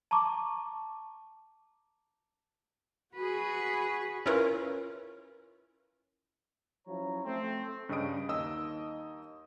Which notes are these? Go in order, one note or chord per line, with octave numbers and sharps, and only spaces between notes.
A5 A#5 C#6 D6
F#4 G#4 B4
C#4 E4 F4 A#4 B4 C#5
F3 F#3 C#4 E4 C#5 A#5
A3 C4
G2 C#3 G3 D#5 D#6 D7
D#2 D#4 D#5 D#6 E6